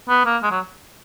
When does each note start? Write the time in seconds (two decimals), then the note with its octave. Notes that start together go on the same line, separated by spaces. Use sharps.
0.09 B3
0.25 A#3
0.43 G#3
0.51 F#3